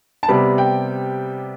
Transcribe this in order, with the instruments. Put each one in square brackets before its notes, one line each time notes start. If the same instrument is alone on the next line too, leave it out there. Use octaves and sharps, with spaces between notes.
[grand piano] A5
C3 G3 B3 B5
G5